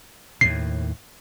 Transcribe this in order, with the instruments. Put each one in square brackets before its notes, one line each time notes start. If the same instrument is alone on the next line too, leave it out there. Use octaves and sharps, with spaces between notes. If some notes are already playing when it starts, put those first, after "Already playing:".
[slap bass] D#2 A2 [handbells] C7